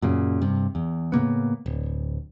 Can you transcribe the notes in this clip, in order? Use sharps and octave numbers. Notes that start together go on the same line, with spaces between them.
F#2 A#2 C#3
G2 C3
E2
A2 C#3 A#3 B3
D1